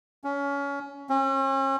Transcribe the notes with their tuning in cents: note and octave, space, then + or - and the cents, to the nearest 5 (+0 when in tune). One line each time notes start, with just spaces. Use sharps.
C#4 +25
C#4 -40